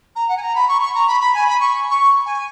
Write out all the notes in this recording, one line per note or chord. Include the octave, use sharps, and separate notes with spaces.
A#5
F#5
G#5
A#5
B5
C#6
C#6
A#5
B5
B5
G#5
B5
C#6
C#6
G#5